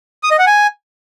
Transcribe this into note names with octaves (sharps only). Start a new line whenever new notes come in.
D#6
D#5
F#5
G#5